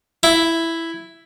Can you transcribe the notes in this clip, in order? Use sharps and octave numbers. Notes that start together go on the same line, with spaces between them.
E4